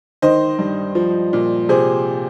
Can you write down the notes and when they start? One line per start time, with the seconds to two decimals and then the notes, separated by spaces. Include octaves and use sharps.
0.22 D#3 C5 D#5
0.59 G2
0.95 F3
1.33 A#2
1.69 C3 G#4 C5